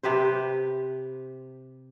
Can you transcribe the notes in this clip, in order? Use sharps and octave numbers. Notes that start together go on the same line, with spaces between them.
C3 G4 B4 C5